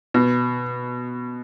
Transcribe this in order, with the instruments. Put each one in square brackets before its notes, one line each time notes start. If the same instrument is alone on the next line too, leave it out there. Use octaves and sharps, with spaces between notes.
[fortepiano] B2